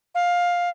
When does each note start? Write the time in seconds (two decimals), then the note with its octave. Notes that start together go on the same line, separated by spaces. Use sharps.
0.15 F5